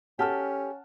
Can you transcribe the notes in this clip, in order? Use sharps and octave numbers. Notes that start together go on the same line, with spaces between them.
C#4 G4 A4 F#5 A5 F6